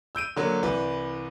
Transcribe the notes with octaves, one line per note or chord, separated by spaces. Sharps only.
E6 G6 D7 D#7
D3 F#3 A#3
C2 E3 B4